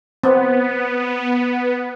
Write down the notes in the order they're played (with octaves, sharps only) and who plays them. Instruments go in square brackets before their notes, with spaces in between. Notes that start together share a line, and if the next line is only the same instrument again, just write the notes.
[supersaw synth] B3 [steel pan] C4